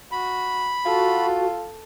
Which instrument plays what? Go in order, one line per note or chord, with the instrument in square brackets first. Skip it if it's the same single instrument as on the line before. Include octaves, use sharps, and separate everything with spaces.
[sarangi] F#4 [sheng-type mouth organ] B5
[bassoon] F4 [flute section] F#4 [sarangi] A4